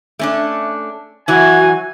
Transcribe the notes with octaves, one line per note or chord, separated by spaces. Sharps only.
A3 C#4 D4
E3 F#3 F#4 G#5